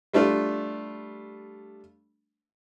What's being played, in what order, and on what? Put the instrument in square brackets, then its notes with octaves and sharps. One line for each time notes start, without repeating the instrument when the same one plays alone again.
[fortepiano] G3 A3 D4 F4